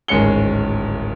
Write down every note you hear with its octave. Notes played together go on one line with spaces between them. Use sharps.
D1 G#1 G#3 C#4 C#7 G7